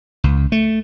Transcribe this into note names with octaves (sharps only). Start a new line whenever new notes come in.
C#2
A3